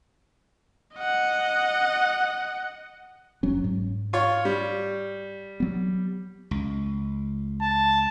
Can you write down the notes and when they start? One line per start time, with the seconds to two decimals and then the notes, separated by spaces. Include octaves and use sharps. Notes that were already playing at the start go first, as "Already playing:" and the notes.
0.97 D#5 F#5
3.43 F#1 F#3 C#4
3.64 G#2
4.13 F4 C#5
4.45 G3
5.60 F#3 B3
6.51 C#2
7.61 A5